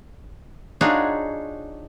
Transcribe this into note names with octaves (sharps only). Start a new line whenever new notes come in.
D4 D#4 F4 F#4 G#4 C#5